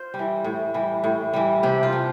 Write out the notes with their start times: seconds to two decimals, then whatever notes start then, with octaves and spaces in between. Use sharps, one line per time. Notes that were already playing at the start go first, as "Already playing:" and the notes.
Already playing: F4 C5
0.14 G3
0.19 E3
0.44 A2
0.74 E3 G3
1.04 A2
1.33 E3 G3
1.63 C3 G4
1.83 F4
1.92 F3